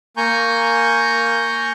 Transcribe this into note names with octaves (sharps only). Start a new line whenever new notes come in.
A#3 G#5 A#5 C#6 G6